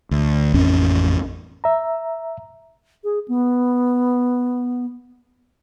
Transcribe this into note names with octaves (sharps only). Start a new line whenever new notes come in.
D2
A1 F2 C#4
E5 A#5
G#4
B3